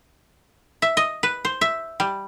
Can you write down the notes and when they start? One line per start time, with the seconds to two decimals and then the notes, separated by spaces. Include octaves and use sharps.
0.82 E5
0.97 D#5
1.23 B4
1.45 C5
1.61 E5
2.00 G3